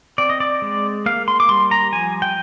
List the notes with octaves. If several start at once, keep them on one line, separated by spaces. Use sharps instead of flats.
C4 D5
D#5
D5
G#3
A#3 F5
C6
D6
G3 C6
A#5
F3 G#5
G5